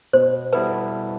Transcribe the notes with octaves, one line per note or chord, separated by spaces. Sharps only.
B2 C5
G3 B3 E4 A4 B4